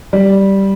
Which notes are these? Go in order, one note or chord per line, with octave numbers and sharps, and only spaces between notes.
G3